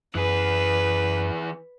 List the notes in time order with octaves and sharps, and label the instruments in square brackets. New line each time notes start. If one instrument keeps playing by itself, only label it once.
[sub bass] F#2 [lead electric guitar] E3 G#4 [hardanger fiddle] B4